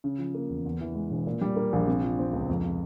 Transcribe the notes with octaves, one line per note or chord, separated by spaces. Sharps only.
C#3
F3
A#3
E2
E2
E3
G#3
E1
A#2
G3
A#3
A#1
C3
F3
C4
C#2
F2
C3